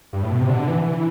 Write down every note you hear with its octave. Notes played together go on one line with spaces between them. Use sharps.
G2
A2
B2
C3
D3
E3
E3